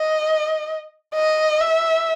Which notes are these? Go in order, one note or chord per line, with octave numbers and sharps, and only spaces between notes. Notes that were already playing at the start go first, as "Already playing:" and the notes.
Already playing: D#5
D#5
E5